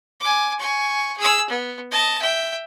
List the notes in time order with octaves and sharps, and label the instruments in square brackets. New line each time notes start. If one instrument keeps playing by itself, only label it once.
[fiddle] G#5 D6
G#5 C#6
G#4 E6
B3
D#5 A5
E5 G5